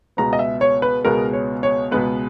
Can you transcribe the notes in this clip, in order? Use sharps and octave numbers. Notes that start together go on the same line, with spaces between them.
C#2 B2 G#3 B3 A#5
D#5
E5
C#5
B4
C#2 B2 G#3 B3 A#4
C#5
C#5
C#2 B2 G#3 B3 B4